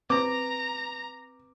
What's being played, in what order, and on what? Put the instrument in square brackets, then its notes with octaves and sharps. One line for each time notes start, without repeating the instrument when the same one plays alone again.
[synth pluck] C4 B4 [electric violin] A#5 [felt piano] D6